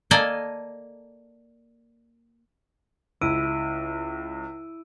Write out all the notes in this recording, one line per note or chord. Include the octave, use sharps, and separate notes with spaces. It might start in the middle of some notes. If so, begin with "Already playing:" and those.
A#3 A4 D5 D#5 G#5
C#2 E4 E6 D7 D#7